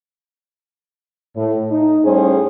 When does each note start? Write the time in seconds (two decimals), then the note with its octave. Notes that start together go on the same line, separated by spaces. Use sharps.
1.36 A2
1.70 D#4
2.05 A2 G3 C#4 G#4 C5